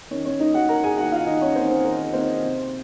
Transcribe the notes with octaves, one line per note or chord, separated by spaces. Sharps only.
D#3 C#4 C#5
C#4 C#5
A#3 D#4 D#5
F#4 F#5
D#3 A#4 A#5
G#4 G#5
A#3 D#4 F#4 F#5
F4 F5
D#3 D#4 D#5
C#4 C#5
A#3 C4 D#4 C5
C4 C5
D#3 A#4
A#3 C4 D#4 C5
C3